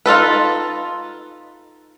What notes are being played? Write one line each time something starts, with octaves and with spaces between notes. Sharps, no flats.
D#4 F4 A4 B4